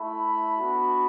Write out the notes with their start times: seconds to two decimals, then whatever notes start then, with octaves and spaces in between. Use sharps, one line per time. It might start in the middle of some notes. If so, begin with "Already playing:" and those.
Already playing: A3 E4 B5
0.57 B3 D4 F#4